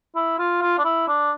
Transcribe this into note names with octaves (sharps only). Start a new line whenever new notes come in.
E4
F4
F4
D4
E4
D4